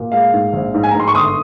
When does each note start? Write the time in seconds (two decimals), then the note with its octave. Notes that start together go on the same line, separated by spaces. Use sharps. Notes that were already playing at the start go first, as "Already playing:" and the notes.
Already playing: A#2
0.12 G#3 F5
0.33 G#2
0.53 A#1
0.74 G#2
0.83 G#5
0.91 A#5
0.95 G#2 C6
1.08 C#6
1.15 G1 C6 D#6